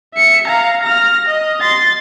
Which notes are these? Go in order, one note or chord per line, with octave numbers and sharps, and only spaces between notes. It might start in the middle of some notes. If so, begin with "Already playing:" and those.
E5 C#7
F5 A#5
F6 A#6
D#5
C6 A6